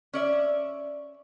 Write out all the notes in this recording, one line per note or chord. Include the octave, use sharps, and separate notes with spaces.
C#4 D5 E5